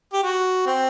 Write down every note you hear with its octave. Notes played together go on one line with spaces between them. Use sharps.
G4
F#4
C4